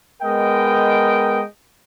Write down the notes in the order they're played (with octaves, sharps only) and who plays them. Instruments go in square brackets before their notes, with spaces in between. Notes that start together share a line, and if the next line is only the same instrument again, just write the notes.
[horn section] G#3 B3 A#4 D#5 G5